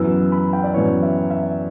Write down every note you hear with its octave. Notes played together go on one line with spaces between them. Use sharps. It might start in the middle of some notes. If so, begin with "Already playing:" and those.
Already playing: F#2 E3 B3 E4 E6
B5
G5
D5
F#2 E3 B3 E4 C#5
E5
E5